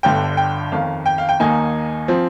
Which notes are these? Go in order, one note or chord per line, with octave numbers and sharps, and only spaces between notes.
G1 G2 D3 G5
G5
G1 F2 D#3 F5
G5
F5
G5
D#2 D#3 A#3 D#4 G#5
F3 C4